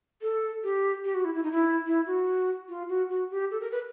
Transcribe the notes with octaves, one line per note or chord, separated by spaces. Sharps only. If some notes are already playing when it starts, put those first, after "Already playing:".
A4
G4
G4
F#4
E4
E4
D#4
E4
E4
F#4
F4
F#4
F#4
G4
A4
A#4
B4